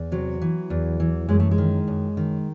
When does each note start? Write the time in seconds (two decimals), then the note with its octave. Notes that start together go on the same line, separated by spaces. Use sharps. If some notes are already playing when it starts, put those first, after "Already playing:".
Already playing: E2
0.12 C3 F#3
0.42 E3
0.70 E2
1.00 E3
1.29 F#2 G#3
1.40 A3
1.51 G#3
1.58 D#3
1.88 F#2
2.17 D#3